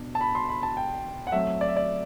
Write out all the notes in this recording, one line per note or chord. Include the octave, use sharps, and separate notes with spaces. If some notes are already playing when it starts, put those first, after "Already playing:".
Already playing: B2 D4
A5
B5
C6
B5
A5
G5
F#5
F#3 A3 C4 E5
D5
E5
D5